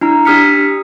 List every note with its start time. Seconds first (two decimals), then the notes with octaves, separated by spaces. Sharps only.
0.01 D4 E4 A#5
0.25 D4 G4 D#6 F6 B6 C#7